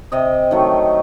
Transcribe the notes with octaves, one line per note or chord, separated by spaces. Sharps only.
C3 D#5
D#3 F#3 A3